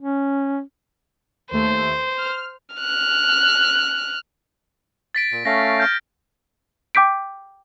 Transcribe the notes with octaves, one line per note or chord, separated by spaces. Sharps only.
C#4
D#2 A3 C5
F6
F6 F#6
A6 B6 D7
A#2
A3 C#4 F5 A#6
F6 G6
G5 D6 G6 B6 D7